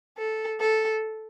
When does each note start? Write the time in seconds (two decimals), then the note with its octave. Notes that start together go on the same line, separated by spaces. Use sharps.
0.18 A4
0.60 A4